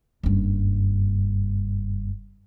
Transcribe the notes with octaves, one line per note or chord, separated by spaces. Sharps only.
F#1 G2